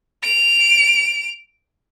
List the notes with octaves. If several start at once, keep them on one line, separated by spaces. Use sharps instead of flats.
D7 F7